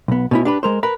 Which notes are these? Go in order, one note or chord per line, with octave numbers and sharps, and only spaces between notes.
B1 B3
B2 C#4 E4
D4 G4 B4
G#3 A#4 C5
A#4 B4